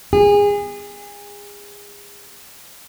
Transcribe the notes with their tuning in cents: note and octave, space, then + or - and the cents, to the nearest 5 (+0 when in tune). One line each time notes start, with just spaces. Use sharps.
G#4 -30